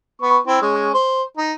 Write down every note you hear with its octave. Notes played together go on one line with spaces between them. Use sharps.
B3 C#6
C4 E4
G#3 C#4
C5
D#4